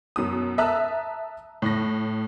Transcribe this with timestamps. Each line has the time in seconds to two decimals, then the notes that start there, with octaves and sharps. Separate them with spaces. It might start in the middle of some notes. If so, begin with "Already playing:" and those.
0.16 F#2 B2 D#6
0.58 E5 A5 A#5 D#6 E6 F#6
1.62 A2 A#6